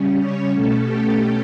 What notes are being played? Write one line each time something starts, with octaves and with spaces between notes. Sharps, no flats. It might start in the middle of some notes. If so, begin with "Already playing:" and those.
Already playing: C#3 G3 C#4
C#5
B2 A3 C#4 A4
G4